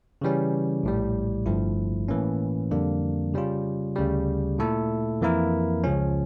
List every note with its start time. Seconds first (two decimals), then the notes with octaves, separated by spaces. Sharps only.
0.21 C#3 E3 G3 C#4
0.83 A#1 A2 G3
1.46 G1 G2 F3 A3 E4
2.08 A2 E3 A#3 C#4
2.71 F2 D3 G3 A#3 D4
3.34 C#3 G3 C#4 F4
3.96 D2 C#3 G3
4.59 A#2 A3 E4 A4
5.21 F2 E3 A#3 E4 A#4
5.84 C#2 C#3 F3 C#4